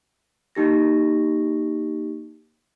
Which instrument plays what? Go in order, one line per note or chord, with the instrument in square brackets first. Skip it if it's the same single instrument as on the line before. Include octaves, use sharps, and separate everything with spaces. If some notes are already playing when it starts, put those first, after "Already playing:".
[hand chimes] A#3 D#4 G4 A#6